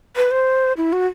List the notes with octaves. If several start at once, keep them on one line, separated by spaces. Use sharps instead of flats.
B4
C5
E4
F#4